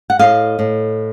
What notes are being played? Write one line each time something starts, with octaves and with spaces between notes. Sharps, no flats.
F#5
A2 D#5 F5
A2